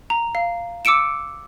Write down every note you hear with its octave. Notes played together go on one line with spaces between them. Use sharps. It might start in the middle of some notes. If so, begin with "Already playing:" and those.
A#5
F5
D6 E6 C#7 D7 E7